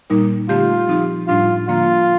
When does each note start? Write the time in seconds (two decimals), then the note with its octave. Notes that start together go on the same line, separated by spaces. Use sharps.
0.10 A#2 G3 A#3 D#4 A#4
0.49 D3 A3 C4 F4 G4
0.88 F3 C4 D#4 G4
1.27 A2 G3 D4 F4
1.68 D3 F3 A#3 F4